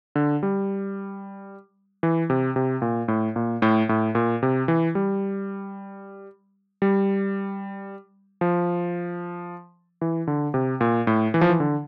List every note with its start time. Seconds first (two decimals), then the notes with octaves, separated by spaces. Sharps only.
0.16 D3
0.43 G3
2.03 E3
2.30 C3
2.56 C3
2.82 A#2
3.08 A2
3.36 A#2
3.62 A2
3.89 A2
4.15 A#2
4.43 C3
4.68 E3
4.95 G3
6.82 G3
8.41 F3
10.01 E3
10.27 D3
10.54 C3
10.81 A#2
11.07 A2
11.34 E3
11.41 F3
11.50 E3
11.60 D3